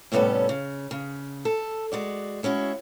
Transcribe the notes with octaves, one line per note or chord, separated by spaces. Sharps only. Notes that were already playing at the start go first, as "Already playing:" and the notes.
A2 C3 G3 B3 C#4 A4
C#3
C#3
A4
G#3 F#4 D5
G#3 C#4 E4 F#4